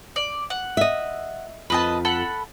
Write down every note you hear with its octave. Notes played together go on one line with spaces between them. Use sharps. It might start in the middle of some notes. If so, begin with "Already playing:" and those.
D5
F#5
D#5 E5
F2 B4 D#5 A5
A4 F#5 B5